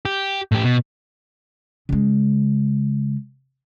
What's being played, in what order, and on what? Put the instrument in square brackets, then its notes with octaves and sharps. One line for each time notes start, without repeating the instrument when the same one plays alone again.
[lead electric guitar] G4
A2 G4
B2
[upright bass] C#3 G#3